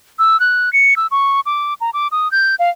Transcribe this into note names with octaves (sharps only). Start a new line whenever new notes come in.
E6
F#6
C#7
E6
C#6
D6
A#5
D6
D#6
G6
F5